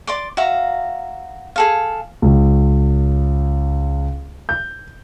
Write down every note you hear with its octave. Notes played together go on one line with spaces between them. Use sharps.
D5 C6 D6
F#4 E5 F5 A#5
G#4 A4 F5
C#2
G6